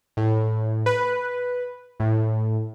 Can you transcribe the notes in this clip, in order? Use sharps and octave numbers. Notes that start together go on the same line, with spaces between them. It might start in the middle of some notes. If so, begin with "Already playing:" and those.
A2
B4
A2